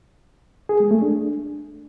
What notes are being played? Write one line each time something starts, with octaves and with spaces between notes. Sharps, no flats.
G#4
G#3
A3
D4